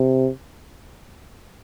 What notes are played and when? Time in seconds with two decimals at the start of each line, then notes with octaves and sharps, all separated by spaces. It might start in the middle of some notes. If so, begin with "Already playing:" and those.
Already playing: C3